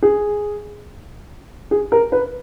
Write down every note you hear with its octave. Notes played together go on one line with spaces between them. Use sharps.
G#4
G#4
A#4
B4